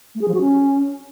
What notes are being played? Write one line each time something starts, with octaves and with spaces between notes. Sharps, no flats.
A3
G#4
F3
F#4
C#4